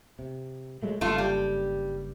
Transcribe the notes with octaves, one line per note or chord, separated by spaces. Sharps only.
C3
F#3 G#3 A3
F#1 G2 A3 F4
G3